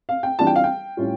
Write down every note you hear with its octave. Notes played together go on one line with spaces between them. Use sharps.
F5
G5
E3 G3 D4 F4 A5
G5
F5
G5
A2 G3 C#4 F4